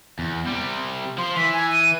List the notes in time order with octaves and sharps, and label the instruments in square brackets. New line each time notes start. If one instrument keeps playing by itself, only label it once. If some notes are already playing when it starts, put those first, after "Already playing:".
[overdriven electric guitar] E2
C3 G3
[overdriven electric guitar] F3 [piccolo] C6
[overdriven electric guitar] E3 [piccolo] B6
[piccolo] G#5
D#7